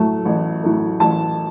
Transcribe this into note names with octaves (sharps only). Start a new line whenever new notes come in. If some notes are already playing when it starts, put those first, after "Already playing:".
Already playing: A2 F#3 A3 A5
A1
A2 F#3 A3
A1 A5